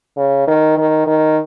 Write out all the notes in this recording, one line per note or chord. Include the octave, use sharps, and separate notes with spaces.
C#3
D#3
D#3
D#3